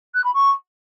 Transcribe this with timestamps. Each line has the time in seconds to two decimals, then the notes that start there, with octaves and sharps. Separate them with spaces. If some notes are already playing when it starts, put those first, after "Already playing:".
0.15 F#6
0.24 B5
0.34 C#6